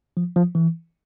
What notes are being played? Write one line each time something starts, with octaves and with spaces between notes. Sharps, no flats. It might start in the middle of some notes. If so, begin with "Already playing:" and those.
F3
F3
E3